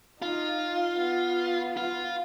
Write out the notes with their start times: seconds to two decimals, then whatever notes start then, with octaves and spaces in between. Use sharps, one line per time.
0.21 D#4 F4
0.99 B3
1.77 F4